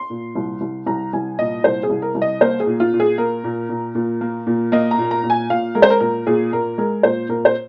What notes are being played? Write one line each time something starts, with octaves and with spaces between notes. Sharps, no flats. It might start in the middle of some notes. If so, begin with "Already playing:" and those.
Already playing: C6
A#2
C2
C2
C2 A#5
C2 G#5
A#2 D#5
C2 C5
G#4
C2
A#4
C2
D#5
A#3 C5
G#4
A#2
F4
A#2
G#4
A#3 A#4
A#2
A#2
A#2
A#3
A#2
A#3 D#5
A#5
A#2
A#5
A#2
G#5
A#2 F5
G#3 A#4
C5
A#4
A#2 A#4
A#2 G#4
A#2 A#4
G#3 A#4
A#2 C5
A#2 A#4
C5